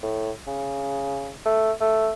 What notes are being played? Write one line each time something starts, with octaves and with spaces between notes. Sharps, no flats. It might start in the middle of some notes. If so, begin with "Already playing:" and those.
A2
C#3
A3
A3